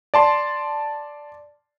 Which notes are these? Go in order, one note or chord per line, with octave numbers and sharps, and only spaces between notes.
D5 A5 C6